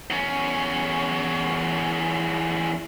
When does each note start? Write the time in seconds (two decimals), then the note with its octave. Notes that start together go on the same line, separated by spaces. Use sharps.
0.10 E2 C#4